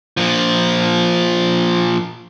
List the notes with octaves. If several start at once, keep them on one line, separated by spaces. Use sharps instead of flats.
A#2 F3